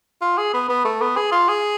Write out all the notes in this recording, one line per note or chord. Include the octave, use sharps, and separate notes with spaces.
F4
G#4
B3
B3
A3
B3
G#4
F4
G#4